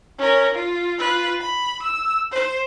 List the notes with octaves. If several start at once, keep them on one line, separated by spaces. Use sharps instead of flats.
C#4 A#4
F4
F4 B4
B5
E6
C5